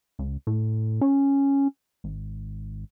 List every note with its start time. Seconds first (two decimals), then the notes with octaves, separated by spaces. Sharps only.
0.19 C#2
0.47 A2
1.01 C#4
2.04 G#1